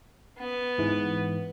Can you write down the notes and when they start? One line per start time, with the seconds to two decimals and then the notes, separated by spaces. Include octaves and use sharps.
0.38 B3
0.78 G#2 E3